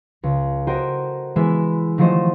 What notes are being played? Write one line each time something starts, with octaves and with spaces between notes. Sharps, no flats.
C#2
F#4 A4 A#4 C5 D#5 G5
E3 G#3 B3 E4 E5
D#3 F3 F#3 A3 C5 D#5